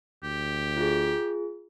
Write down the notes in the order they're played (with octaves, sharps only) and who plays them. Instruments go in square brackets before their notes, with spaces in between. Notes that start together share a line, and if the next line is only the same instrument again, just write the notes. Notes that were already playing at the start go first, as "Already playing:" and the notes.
[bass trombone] D2 [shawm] G4
[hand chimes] F4 G#4